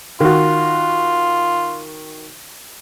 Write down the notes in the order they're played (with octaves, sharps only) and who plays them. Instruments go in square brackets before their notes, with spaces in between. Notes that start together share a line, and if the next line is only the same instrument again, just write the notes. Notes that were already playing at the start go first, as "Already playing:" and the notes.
[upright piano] D#3 F#4 [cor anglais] F4